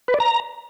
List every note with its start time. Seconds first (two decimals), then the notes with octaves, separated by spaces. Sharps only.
0.08 B4
0.14 D5
0.20 A#5